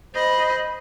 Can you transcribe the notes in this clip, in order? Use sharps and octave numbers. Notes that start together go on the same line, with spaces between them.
C5 D#5 B5